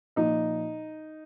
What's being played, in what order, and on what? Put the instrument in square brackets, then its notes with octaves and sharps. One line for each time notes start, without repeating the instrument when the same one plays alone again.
[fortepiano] A#2 F3 D#4 D#5